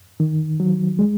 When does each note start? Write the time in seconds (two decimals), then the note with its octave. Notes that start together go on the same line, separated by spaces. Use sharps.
0.20 D#3
0.60 F#3
0.99 G#3